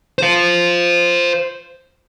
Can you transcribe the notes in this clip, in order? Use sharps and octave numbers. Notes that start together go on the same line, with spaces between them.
C5 F5